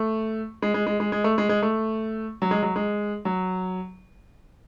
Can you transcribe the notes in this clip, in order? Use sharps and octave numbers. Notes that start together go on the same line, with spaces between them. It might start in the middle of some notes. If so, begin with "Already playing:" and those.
Already playing: A3
G#3
G#3
G#3
G#3
G#3
A3
G#3
G#3
A3
F#3
G#3
F#3
G#3
F#3